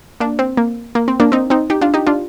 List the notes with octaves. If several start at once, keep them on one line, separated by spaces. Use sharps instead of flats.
A#3 D4
C4
A#3
A#3
C4
A#3 D4
C4 D#4
C4 D#4
D#4 G4
D4 F4
D#4 G4
D4 F4